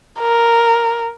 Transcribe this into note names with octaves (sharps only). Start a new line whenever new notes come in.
A#4